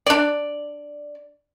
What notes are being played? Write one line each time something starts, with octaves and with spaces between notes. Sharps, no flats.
D4 D5